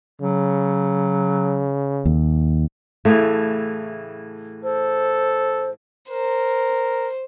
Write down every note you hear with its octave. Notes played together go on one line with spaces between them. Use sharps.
C#3 F#3
D#2
A2 C#3 E3 A3
A4 C5
A#4 C5